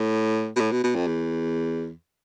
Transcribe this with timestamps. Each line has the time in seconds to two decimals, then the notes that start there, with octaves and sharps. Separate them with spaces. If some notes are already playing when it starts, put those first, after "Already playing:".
Already playing: A2
0.56 B2
0.60 A2
0.71 B2
0.83 B2
0.95 F2
1.07 E2